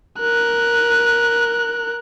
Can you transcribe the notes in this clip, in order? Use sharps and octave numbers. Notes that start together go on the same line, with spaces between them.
A#4 F#6